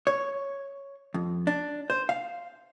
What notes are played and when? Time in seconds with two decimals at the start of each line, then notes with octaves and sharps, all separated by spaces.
0.07 C#5
1.14 F2
1.47 D4
1.90 C5
2.09 F5